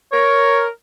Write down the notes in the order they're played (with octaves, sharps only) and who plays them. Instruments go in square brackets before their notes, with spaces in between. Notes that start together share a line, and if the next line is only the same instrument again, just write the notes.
[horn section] A#4 [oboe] C#5